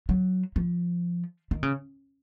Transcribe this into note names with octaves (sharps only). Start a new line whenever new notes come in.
F#3
F3
D#3
C#3